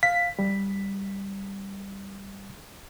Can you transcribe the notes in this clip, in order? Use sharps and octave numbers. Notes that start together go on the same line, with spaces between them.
F5 B6
G3